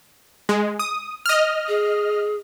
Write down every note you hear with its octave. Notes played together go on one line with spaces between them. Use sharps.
G#3
D#6
D#5 F6
G#4